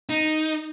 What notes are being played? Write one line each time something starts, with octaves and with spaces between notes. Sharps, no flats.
D#4